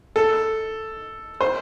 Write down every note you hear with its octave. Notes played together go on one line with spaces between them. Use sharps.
A4
C5